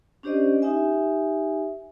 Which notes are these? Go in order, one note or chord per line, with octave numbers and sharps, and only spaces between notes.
C#4 D4 G4 C5 D5 D#5
D#4 G4 E5 G#5